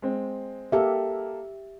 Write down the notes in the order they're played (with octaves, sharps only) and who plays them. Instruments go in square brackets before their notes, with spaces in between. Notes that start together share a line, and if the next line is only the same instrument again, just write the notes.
[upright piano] G#3 C4
[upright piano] A#3 A4 [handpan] G4 E5